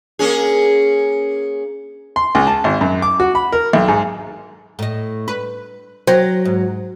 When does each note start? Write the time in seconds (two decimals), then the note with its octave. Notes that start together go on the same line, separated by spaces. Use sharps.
0.19 A#3 C#4 G#4
2.16 C6
2.35 C#2
2.47 A5
2.64 G#1
2.81 F#2
3.02 D6
3.20 F#4
3.35 B5
3.52 A#4
3.73 B1
3.88 G#2
4.79 A2 D#5
5.28 B4
6.07 F#3 C5 G5 A#6
6.45 G#2